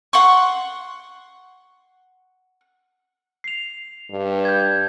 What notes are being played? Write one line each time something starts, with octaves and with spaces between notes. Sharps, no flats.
F#5 C6 C#6
C7 F7
G2
G6 G#6